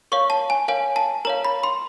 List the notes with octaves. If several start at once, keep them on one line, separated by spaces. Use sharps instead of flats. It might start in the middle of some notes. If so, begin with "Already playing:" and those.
A#4 C#5 F5 C#6
A5
G#5
A#4 C#5 F5 G#5
A5
A#4 C#5 F5 A#5
B5
C6